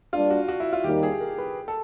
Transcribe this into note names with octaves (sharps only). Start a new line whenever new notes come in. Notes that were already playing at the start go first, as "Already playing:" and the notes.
G3 A#3 D4 F4
F#4
F#4
E4
F4
D#2 D#3 G3 A#3 D#4 G4
G#4
A#4
B4
A4